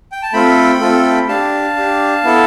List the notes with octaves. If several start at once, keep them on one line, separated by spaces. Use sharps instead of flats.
G5
A5
A3 C4 F4 A4 G5 B5
A3 C4 F4 A4
D4 G4 F5 A5
D4 G4
B3 E4 A4